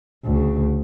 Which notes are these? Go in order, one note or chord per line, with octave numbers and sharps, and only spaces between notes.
D2 C#3